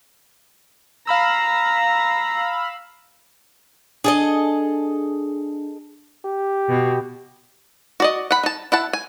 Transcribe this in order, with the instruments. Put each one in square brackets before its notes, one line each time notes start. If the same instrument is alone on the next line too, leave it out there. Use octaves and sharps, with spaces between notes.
[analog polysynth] F5 B5 E6 [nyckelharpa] A#5
[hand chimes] D4 [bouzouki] G#4 A4 D#5
[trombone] G4
[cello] B2
[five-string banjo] F#4 D5 D#5
F#5 B5
D#4 A5
E4 F#5 A5
G#5